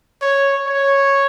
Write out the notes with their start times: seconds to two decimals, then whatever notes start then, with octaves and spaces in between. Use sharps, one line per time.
0.22 C#5
0.67 C#5